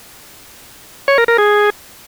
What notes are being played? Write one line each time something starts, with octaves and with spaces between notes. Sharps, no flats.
C#5
A#4
A#4
G#4